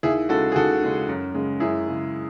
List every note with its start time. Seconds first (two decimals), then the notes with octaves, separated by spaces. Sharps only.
0.03 D#2 E4 G#4
0.29 C#3 G#3 F#4 A4
0.52 G#4
0.55 D#2 F#4 A4
0.82 C#3 G#3
1.08 F#2
1.34 C#3 G#3
1.60 F#2 E4 G#4
1.86 C#3 G#3